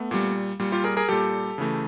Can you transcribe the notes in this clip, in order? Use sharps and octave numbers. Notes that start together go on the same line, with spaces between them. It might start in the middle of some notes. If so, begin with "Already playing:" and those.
Already playing: A3 B3
A#2 G3
A#2 G3
F4 G4
G#4 A#4
G#4 A#4
A#2 G3 G4 A4
C#3 E3 A3